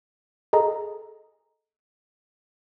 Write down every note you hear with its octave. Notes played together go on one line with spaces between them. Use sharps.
G#4 A4 D#5 A#5